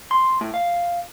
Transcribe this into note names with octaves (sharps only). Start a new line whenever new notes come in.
C6
A2
F5